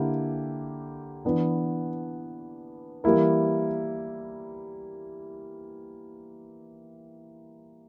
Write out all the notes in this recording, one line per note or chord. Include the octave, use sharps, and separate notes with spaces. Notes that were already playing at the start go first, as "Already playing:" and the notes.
Already playing: D3 A#3 E4 G4
E3 B3 D4
E3 G3 A#3 E4 A#4